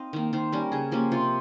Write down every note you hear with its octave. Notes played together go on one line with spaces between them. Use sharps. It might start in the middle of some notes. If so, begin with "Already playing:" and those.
Already playing: C4 D#4 D#5 F5
D#3 A#3
D#3 C5
G3 C#4 A#4
C#3 G#4
F3 A#3 C#4 G4
C3 F4